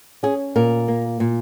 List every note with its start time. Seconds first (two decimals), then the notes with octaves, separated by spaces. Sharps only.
0.23 C#4 G#4
0.56 A#2 A#4
0.88 A#3
1.20 A#2